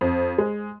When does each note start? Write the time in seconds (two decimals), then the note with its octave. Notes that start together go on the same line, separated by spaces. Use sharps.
0.01 F2
0.38 G#3